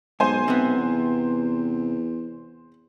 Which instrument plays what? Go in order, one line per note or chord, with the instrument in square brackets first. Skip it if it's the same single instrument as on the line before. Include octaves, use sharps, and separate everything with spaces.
[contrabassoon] B1 [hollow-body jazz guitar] G#2 [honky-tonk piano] C5 G#5
[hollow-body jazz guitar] C3 B3
[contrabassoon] E2